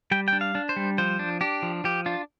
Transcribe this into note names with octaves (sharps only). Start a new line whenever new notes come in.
G3 G5
G5
D4
F5
D4
C5
G3
F3 C5
D4
D4 G4
F3
F3 G4
D4 F4